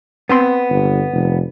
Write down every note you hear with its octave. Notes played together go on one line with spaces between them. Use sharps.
B3 C4 C6
G1
F1